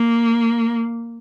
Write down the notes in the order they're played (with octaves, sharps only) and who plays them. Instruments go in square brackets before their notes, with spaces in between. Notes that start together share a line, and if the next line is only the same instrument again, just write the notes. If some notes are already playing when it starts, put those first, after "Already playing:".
Already playing: [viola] A#3